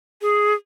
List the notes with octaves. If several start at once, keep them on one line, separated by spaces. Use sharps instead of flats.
G#4